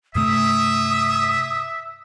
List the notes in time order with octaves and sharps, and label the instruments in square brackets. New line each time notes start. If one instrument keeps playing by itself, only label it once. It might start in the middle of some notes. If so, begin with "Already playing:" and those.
[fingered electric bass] G2 C3 A3 [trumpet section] E5 [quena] D#6